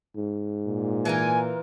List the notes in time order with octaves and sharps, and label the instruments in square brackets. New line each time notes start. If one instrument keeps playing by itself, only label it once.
[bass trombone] G#2
[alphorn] A#2
[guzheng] E3 F4 A#4 [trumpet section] G#5